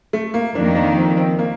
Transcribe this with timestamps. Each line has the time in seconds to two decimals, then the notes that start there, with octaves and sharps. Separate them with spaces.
0.13 A3
0.34 A#3
0.54 F2 D#3 A#3 D4
0.75 D4
0.97 C4
1.17 C4
1.39 A#3